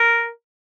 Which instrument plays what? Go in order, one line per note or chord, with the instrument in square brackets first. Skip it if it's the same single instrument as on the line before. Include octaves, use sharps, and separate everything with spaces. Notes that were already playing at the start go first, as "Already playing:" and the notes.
Already playing: [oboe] A#4